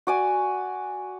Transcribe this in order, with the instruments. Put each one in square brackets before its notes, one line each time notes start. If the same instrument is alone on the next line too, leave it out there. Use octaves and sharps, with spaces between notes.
[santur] F#4 D5 G#5